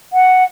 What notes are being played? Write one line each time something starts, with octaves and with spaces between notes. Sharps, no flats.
F#5